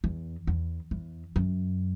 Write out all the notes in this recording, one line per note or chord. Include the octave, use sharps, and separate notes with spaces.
E2
E2
E2
F#2